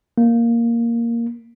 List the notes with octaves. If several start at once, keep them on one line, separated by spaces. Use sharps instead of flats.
A#3